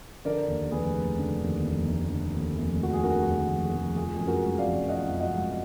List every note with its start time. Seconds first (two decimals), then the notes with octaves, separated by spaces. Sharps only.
0.25 D3 A#4 D5
0.48 D#2
0.71 F1 G#4 B4
0.95 F1
1.18 D3
1.41 D#2
1.64 F1
1.88 F1
2.11 D3
2.34 D#2
2.57 F1
2.81 F1 F#4
2.93 G#4
3.04 D3 F#4 A#4
3.27 D#2
3.50 F1
3.66 G#4
3.73 F1
3.96 F3 G#4
4.17 F#2 G#4
4.27 F#4 A#4
4.43 G#3
4.58 D5 F5
4.66 G#1
4.89 F3 D#5 F#5
5.12 F#2
5.20 D#5 F#5
5.35 G#3